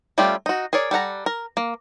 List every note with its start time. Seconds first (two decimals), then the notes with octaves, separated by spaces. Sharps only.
0.18 G3 A3 C#4 F4 G4
0.46 D#4 F#4
0.73 G#4 A#4 C#5 D5
0.91 G3 A4 F#5 A#5
1.26 A#4
1.57 A#3